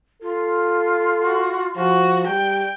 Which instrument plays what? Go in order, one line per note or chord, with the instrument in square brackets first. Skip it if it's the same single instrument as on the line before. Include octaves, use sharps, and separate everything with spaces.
[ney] F4 [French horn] A4
[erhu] F#4
[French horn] F3 [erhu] F#4
[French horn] G3 [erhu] G5